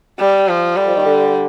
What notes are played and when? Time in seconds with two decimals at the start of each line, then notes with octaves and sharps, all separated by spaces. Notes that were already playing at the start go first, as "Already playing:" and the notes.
0.20 G3
0.48 F3
0.77 D3 G3
0.86 F2 F3
0.96 D#2 D#3
1.05 D3